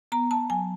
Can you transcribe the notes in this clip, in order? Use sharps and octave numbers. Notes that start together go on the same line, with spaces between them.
B3 A#5
B3 A5
F#3 G#5